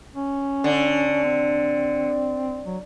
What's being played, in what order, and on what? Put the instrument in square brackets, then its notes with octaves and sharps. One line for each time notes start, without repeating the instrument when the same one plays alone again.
[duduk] C#4
[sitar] D3
[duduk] C4
F#3